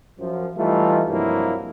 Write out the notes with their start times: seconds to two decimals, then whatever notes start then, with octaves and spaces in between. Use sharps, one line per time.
0.19 F#2 F3
0.56 E3 G3 A3 D#4 F4
1.09 G2 C3 F3 F#3 A#3 E4